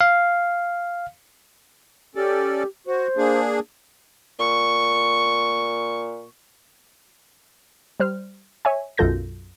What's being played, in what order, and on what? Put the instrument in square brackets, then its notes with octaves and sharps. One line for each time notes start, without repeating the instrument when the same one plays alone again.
[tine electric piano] F5
[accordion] C#4 A4 D5 [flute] G4
[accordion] F#4 [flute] C5
[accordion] A#3 D4 G#4
[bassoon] A#2 [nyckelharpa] C#6
[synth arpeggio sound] G3 C5 F6
C#5 E5 G#5
B1 F#2 F4 A4 G6 A#6